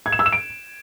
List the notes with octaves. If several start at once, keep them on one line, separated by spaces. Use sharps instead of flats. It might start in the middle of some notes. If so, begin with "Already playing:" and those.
G#6
E7
E6
E7
D7